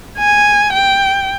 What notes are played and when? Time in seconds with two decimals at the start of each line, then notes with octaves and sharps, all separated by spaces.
0.18 G#5
0.73 G5